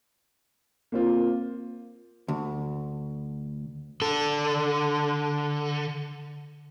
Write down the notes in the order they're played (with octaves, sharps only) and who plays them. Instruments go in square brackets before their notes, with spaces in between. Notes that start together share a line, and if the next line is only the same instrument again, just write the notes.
[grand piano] A#3 C4 F4
[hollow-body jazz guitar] D2
[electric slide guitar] D3 A4